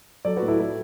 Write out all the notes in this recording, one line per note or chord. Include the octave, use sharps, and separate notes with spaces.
F#3 A4 D5
F#4 B4
A2
E4 A4
A2 E4 A4